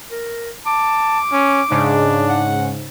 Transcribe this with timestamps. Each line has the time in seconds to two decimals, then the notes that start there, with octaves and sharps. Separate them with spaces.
0.11 A#4
0.66 A5 D6
1.32 C#4
1.71 G#2 C#3 D4
2.29 F#5